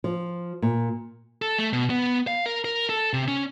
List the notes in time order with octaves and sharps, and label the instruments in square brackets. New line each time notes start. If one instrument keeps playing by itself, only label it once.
[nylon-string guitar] F3
A#2
[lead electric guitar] A4
A3
B2
B3
F5
A#4
A#4
A4
C3
C#4